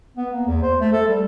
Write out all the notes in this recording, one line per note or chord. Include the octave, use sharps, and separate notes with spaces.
B3
A#3
E2
C5
A3
A4
G3